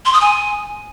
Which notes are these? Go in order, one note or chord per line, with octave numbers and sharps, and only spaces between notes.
C6
D#6
G#5